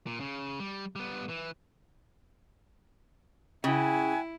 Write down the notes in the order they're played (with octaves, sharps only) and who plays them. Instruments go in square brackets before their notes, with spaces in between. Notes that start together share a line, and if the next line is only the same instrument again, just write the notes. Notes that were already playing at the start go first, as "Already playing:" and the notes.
[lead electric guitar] A#2
C#3
G3
G3 B3
E3
[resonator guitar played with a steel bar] C#3 [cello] E4 [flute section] F#4 G#5 G#6 [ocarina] G5